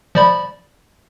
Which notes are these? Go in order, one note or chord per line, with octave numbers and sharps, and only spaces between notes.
F3 D5 B5